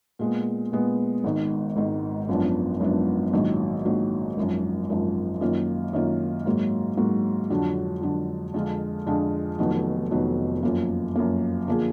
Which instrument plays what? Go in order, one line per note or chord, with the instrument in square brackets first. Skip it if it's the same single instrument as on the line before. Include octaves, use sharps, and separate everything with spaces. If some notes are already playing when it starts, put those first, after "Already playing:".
[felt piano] A#2 G#3 B3
A#2 G#3 B3
G#1 G#2 D#3
G#1 G#2 D#3
G#1 F#2 F3 B3 D4
G#1 F#2 F3 B3 D4
A#1 G#2 D#3 F#3
A#1 G#2 D#3 F#3
G#1 F#2 F3
G#1 F#2 F3
F#2 D#3 A#3 F4
F#2 D#3 A#3 F4
G#2 F#3 A#3
G#2 F#3 A#3
F2 D3 F#3 D4
F2 D3 F#3 D4
F2 D3 G#3 D4 F4
F2 D3 G#3 D4 F4
F1 F2 D#3 F#3 B3
F1 F2 D#3 F#3 B3
F#2 F3 A#3
F#2 F3 A#3
D3 F3 A#3 D4 G#4